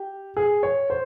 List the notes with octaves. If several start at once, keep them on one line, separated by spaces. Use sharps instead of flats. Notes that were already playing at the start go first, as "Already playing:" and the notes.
Already playing: G4
G#4
C#5
C5